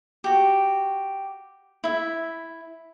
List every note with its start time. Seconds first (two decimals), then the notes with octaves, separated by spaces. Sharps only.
0.24 F#4 G4
1.84 E4 E5